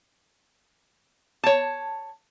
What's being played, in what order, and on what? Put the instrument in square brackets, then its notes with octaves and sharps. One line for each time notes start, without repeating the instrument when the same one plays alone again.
[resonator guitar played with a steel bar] C#5 A5